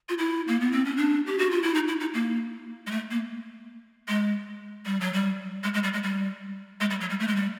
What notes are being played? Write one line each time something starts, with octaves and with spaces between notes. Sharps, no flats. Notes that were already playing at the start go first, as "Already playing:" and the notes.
F4
E4
A#3
B3
C4
C#4
D4
G4
F#4
F4
E4
D#4
E4
D#4
A#3
G#3
A3
A#3
G#3
G3
F#3
G3
G#3
G#3
G3
G#3
G3
G#3
G3
F#3
G3
A3
G#3
G3